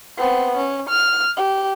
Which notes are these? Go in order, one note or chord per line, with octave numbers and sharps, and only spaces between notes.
B3 C4
C#4
F6
G4